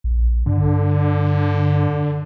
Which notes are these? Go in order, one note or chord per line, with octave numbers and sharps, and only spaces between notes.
A#1
G2 D3